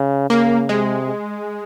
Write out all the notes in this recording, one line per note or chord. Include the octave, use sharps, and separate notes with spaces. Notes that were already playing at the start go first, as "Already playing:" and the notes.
Already playing: C#3
C#3 A#3
C3 G#3